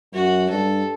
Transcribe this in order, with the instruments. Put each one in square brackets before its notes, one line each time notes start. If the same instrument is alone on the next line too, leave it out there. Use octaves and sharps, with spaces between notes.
[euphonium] F#2 [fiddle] F#4
[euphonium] G2 [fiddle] A4